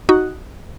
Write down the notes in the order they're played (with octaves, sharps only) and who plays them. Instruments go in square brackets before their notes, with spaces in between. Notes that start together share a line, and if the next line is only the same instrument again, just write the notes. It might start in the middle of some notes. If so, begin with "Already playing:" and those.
[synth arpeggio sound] D#4 F#4